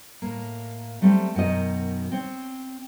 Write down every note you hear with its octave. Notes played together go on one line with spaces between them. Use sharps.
A2 A#3
F#3 G3 A3 C4
F#2 B2 D#3 D#5
C4 C#5